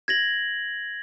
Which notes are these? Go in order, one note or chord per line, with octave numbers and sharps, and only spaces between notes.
G#6 A#6 F#7